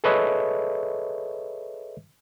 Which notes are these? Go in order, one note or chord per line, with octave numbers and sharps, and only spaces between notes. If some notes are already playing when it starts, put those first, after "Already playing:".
G#4 A4 B4 C#5 D#5 E5